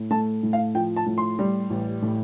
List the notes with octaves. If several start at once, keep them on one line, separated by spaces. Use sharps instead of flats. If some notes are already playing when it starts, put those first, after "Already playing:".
Already playing: A2
A3 A5
A2
F5
F3 G5
A5
A2
C6
G3
A1
A2